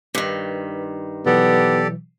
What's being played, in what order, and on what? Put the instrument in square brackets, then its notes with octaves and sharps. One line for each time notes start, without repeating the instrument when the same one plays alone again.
[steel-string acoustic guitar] G2 D#3 [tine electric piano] B4 B6
[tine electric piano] B2 E3 F#3 [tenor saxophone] B3 [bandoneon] G4 A4 D5